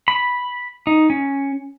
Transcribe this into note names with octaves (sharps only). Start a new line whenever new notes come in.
B5
D#4
C#4